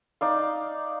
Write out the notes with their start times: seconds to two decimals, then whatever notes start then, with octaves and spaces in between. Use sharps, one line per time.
0.21 D#4 D5 F5